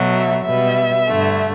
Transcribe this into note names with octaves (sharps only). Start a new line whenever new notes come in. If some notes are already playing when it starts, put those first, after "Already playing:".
Already playing: B2 F#3 A3
E5
B2 G3 B3 E5
G2 D3 A3